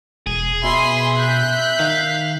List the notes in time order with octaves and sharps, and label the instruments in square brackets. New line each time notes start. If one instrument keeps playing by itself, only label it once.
[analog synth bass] E1 [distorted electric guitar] G#4
[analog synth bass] B2 [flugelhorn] E5 [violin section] G#5 B5 C6
[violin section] F#6 G6 B6
[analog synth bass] D#3 [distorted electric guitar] F5